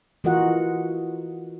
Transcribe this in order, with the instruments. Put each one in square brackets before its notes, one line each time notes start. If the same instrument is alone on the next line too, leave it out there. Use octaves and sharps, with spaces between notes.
[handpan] E3 F4 F#4 A#4 D#5 F#5